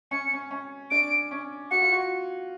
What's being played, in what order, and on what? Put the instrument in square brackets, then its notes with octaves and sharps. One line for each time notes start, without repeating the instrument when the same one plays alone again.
[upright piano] C#4 [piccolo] C#7
[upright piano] C#4
C#4
[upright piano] D4 [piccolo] D7
[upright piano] C#4
[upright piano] F#4 [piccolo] C#7
[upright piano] F4
F#4